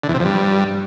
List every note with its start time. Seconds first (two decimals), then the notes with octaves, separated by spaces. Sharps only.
0.04 D3
0.09 E2
0.14 C3
0.20 F2
0.25 G2